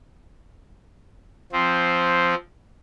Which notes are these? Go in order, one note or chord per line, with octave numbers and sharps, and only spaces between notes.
F3 C4